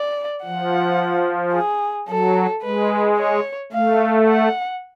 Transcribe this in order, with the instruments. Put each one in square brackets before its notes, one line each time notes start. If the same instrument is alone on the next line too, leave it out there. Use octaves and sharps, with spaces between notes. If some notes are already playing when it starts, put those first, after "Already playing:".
Already playing: [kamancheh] D5
[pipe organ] F3 [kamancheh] F#5
[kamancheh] G#4
[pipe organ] F#3 [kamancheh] A4
[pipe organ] G#3 [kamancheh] B4
[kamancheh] C#5
[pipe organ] A3 [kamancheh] F5
[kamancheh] F#5